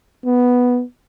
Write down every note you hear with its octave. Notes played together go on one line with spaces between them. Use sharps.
B3